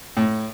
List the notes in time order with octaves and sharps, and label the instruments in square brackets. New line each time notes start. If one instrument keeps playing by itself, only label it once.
[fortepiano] A2